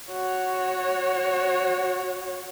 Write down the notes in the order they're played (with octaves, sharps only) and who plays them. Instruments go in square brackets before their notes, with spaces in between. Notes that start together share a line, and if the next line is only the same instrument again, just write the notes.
[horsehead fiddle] F#4 C#5